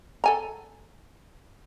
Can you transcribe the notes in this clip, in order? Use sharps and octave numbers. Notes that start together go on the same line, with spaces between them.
A4 G#5 A#5